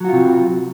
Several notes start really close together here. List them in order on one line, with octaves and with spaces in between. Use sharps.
F#3 F#4 F4 C3